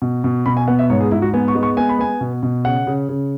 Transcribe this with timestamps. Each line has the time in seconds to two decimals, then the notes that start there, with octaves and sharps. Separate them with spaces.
0.02 B2
0.24 B2
0.46 B2 B5
0.57 G#5
0.68 B3 F#5
0.79 E5
0.90 G#2 C#5
1.00 G#4
1.11 G#2 E4
1.22 F#4
1.34 B3 G#5
1.48 C#6
1.55 G#3
1.63 C#6
1.77 B3 G#5
1.89 B5
1.99 B3 G#5
2.21 B2
2.43 B2
2.65 C#3 F#5
2.87 C#3
3.09 C#3